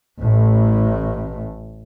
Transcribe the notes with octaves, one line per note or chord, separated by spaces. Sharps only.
A1 A2